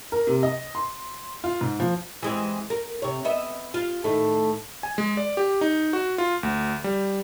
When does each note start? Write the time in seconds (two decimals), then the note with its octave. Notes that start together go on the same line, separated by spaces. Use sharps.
0.12 A#4
0.27 C3
0.43 D#5
0.75 C6
1.44 F4
1.61 G#2
1.80 F3
2.23 E3 G#3 C4
2.70 A#4
3.02 C3 C#5
3.25 B3 D#5 E5
3.74 F4
4.04 A2 D#3 A3
4.83 G#5
4.98 G#3
5.17 D5
5.37 G4
5.61 D#4
5.93 F#4
6.18 F4
6.43 D2
6.84 G3